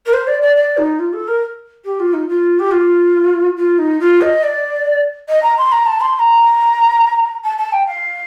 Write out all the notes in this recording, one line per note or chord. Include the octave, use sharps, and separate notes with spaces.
A#4
C5
D5
D5
D5
D#4
F4
A4
A#4
G4
F4
D#4
F4
G4
F4
F4
D#4
F4
D#5
D5
D#5
A#5
C6
A#5
A5
C6
C6
A#5
A5
A5
G5
F5